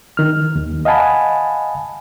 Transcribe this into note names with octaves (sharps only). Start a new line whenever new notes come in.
D#3 F6
D#2
D#5 F5 F#5 G#5 A5 B5